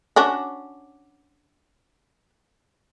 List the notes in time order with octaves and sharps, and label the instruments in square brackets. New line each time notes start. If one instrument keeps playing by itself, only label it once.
[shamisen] C#4 D4 F#4